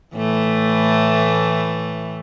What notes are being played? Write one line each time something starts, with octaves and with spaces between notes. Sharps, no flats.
A2 E3 A3